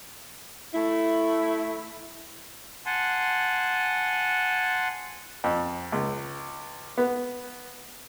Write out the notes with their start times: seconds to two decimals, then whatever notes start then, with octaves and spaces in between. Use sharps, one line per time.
0.74 A3 E4
2.86 F#5 G#5 A5 C6
5.44 F2
5.92 C#2
6.98 B3